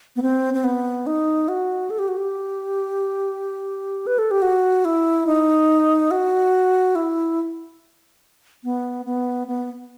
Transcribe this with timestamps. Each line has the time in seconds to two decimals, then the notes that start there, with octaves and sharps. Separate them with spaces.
0.16 B3
0.22 C4
0.54 C4
0.64 B3
1.07 D#4
1.48 F#4
1.90 A4
1.99 G4
2.08 F#4
2.17 G4
4.07 B4
4.18 A4
4.31 G4
4.42 F#4
4.85 E4
5.27 D#4
6.11 F#4
6.95 E4
8.64 B3
9.06 B3
9.48 B3